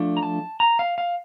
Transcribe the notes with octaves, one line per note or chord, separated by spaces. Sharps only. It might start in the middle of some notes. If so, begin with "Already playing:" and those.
Already playing: F3 A3 D4
A#5
A5
A#5
F5
F5